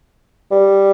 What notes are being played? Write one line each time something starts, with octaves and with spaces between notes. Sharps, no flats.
G3